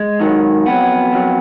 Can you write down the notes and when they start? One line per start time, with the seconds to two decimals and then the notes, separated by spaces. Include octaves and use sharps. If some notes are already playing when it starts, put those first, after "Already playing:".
Already playing: G#3
0.20 G#2 D#3 F#3
0.66 F2 D#3 B3
0.71 F#3
1.12 F2 D#3 F#3